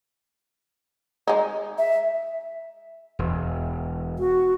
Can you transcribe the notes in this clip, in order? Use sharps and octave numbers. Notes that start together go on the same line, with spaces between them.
G#3 D#4
E5
E1
F#4